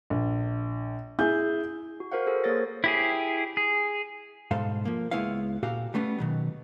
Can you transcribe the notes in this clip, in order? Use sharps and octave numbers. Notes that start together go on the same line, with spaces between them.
A#1
E4 G#4 G#5 G6
F#4
F#4 A#4 C5 F5 F#5
G#4 A4 C5
A#3 G#4 A#4 C#5 A6 A#6
E4 G4 G#4
G#4
G#2 B2 G3 A4 C5 F5
F3 A#3
C#2 G#3 B3 E4 C#5 F5
A#2 F#4 G4 A4 F5
G3 A3 B3 C#4
B2 D#3 F#3